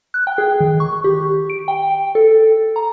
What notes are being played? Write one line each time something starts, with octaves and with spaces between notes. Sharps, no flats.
F#6
G5
G#4
D#3
C#6
G4
D7
G5
A4
A#5